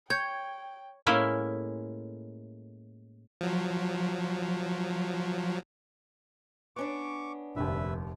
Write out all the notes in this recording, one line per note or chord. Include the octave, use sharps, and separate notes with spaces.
C#5 G5 G6 G#6
A2 G#3 A#3 C#4 E4 E5
F3 F#3
B3 C#4 D4 C#6 D6
F1 A#1 D#2 B4 E5